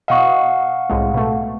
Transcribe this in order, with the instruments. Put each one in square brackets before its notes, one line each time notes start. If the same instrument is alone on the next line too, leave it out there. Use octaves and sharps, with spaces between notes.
[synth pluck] B2 D#5 [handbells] F5 F#5 C#6
[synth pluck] C2 A2 G#3
B2 A3